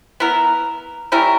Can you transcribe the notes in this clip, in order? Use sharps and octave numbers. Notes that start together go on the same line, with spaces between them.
B3 E4 A#4
G3 C#4 E4 A#4